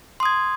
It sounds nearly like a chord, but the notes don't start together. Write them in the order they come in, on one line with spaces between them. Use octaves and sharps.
C6 D#6 G#6